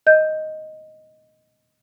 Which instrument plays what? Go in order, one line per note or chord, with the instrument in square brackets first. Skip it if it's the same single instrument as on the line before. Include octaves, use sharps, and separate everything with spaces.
[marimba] D#5 G6